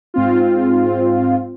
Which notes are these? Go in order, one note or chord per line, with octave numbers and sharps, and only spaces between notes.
G#2 C4 F4